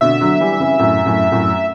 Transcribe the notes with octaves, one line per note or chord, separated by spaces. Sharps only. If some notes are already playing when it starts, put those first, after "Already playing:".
B2 D3 E5
D3 F#3
E3 G3
C#3 E3
F#2 A2
F#2 A2
F#2 A2